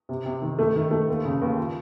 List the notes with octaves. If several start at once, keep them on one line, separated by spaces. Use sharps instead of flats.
C3
C3
D#3
A3
D#3
A3
D#2
C#3
D#2
F4